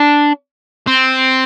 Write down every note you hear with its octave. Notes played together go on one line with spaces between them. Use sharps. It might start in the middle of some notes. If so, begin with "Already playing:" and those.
Already playing: D4
C4